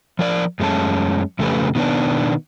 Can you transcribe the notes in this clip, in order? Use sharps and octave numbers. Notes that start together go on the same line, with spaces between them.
F3 A#4 D5
F#2 G#3 A3 C#4 A5
F2 C#3 A3 D4 G4 B4
B2 D#3 B3 D4